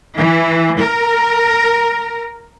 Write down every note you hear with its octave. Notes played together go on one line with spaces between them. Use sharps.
E3
A#4